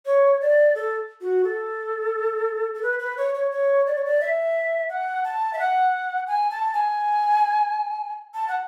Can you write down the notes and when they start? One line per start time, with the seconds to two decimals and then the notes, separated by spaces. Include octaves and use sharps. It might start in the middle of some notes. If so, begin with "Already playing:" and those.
0.06 C#5
0.41 D5
0.75 A4
1.21 F#4
1.44 A4
2.74 A4
2.83 B4
2.99 B4
3.17 C#5
3.34 C#5
3.51 C#5
3.86 D5
3.96 C#5
4.05 D5
4.21 E5
4.89 F#5
5.24 A5
5.53 E5
5.59 F#5
6.27 G#5
6.51 A5
6.74 G#5
8.34 A5
8.48 F#5